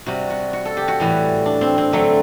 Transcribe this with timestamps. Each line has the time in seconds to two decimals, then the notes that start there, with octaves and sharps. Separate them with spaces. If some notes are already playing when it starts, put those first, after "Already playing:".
0.06 C3 G3 F#4
0.30 F#4
0.53 F#4
0.65 A4
0.77 G4
0.88 F#4
1.00 A2 E3 G3
1.46 D4
1.61 C4
1.78 C4
1.93 D3 F#3 A3 C4